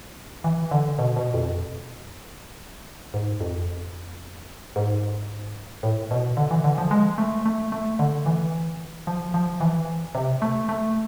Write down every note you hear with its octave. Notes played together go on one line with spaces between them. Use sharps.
E3
D3
B2
B2
F2
G#2
F2
G#2
A2
B2
D3
E3
D3
F3
G#3
A3
A3
A3
D3
E3
F3
F3
E3
C3
A3
A3